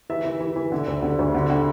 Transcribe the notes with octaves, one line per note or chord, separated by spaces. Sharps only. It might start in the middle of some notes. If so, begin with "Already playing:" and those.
E3 E5
E3
E3
E3
D3
D2
D3
D2
D3
D3